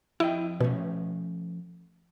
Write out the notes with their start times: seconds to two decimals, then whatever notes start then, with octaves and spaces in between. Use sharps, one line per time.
0.20 F2 E4 D#5 G5
0.60 B2 F3 A3 C#4